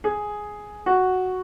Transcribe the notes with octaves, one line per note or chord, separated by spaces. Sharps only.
G#4
F#4